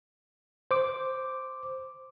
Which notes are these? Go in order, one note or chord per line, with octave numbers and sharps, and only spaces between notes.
C5 D6